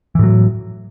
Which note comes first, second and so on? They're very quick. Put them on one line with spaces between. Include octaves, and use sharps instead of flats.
E3 A2 F#3